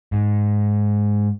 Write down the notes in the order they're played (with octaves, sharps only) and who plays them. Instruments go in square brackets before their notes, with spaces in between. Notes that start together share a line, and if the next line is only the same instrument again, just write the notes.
[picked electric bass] G#2